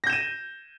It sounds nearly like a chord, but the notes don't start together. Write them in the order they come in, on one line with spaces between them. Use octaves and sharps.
A#6 G6 E7 D#7